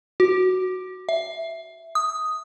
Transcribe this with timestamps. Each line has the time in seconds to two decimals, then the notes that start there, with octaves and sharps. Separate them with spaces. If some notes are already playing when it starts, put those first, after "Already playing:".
0.20 F#4
1.09 E5
1.95 D#6